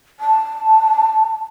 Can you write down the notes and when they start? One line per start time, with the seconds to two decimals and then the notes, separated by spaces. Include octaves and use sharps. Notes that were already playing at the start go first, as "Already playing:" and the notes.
0.20 A5